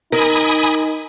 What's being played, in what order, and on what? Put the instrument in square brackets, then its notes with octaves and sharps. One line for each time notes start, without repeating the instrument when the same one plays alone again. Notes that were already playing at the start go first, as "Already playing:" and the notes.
[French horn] D#4 [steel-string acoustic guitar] A#4 [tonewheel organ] G#5 B5 D#6